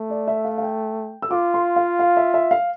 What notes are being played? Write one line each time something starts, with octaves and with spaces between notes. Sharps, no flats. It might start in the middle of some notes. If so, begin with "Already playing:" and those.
Already playing: A3
D5
E5
F5
F5
G5
E6
F4 D6
C6
F5
F5
E5
E5
F5